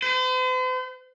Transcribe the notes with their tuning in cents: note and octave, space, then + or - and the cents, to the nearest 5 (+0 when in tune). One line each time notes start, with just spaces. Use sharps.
C5 -45